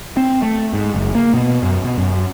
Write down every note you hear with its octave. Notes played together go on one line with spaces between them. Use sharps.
C4
A3
G#2
F#1
A#3
B2
F#2
B2
F#2